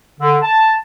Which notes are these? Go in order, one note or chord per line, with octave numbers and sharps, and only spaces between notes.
D3
A5